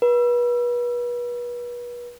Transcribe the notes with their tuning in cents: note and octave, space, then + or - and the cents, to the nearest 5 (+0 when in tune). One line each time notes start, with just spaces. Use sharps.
B4 -35